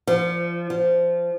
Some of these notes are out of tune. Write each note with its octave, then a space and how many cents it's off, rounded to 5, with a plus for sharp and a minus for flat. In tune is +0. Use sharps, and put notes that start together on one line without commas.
F3 -25
F3 -15